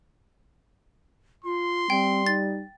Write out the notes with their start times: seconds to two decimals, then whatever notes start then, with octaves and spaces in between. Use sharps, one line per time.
1.44 F4 C6
1.90 G3 C4 G5
2.27 D#4 A6